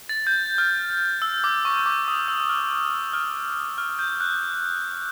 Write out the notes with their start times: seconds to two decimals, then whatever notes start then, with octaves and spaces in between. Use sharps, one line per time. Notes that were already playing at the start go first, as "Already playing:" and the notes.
0.09 A6
0.27 G6
0.58 F6
1.22 E6
1.44 D6
1.65 C#6
1.86 D6
2.08 D#6
2.28 E6
2.49 F6
3.13 F6
3.78 F6
3.99 G6
4.20 F#6